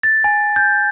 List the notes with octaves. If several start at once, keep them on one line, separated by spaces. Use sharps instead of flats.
A6
G#5
G6